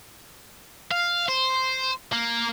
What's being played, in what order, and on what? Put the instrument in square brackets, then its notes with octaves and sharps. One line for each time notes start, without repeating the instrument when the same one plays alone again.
[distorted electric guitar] F5
C5
A#3